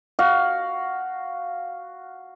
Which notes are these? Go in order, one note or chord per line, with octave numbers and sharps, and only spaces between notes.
F#4 F5